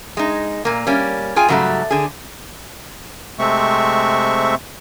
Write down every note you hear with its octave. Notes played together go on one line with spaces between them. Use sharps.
G#3 D#4
A#2 A#3
G3 A#3 C#4
F4 G#4 G5 G#5
G#2 C#3 F#3 G3 A3
D3 G#4
C3 G#3 A3 C4 E5 C#6